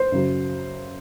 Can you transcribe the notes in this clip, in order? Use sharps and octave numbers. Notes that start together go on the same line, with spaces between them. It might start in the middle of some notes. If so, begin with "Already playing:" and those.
Already playing: C5
F#2 C#3 F#3